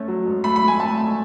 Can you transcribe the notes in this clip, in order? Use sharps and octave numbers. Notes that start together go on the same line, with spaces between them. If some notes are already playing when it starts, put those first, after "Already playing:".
Already playing: A3 C#4
F#3
G#2
A3 B5
B5
A3
G#5
A3 A5
A3